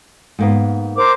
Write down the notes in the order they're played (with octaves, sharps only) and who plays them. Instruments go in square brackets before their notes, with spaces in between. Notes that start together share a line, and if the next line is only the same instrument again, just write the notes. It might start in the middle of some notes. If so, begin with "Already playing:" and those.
[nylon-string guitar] G#2 A#3 B3
[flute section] A#4 C5 D6